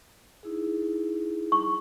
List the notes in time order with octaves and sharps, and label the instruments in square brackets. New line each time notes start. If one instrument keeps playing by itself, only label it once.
[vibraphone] D#4 E4 G#4
[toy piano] C#6